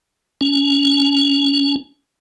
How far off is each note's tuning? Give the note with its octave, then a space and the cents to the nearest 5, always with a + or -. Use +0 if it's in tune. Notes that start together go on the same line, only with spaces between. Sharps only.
C#4 +25